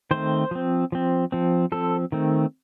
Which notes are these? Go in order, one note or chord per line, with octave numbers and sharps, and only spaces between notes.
D#3 A3 C4 C5
F3 C4
F3 C4
F3 C4
F3 C4 A4
D#3 A3 C4